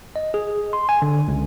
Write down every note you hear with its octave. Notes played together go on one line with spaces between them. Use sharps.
D#5
G#4
C6
G#5
D3
C#2